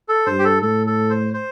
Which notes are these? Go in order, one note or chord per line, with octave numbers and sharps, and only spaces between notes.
A4
G2 C5
G4
A4
A2 A4
A4
C5
C5